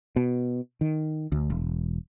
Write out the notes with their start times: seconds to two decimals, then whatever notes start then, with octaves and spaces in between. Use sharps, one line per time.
0.16 B2
0.81 D#3
1.32 D2
1.50 E1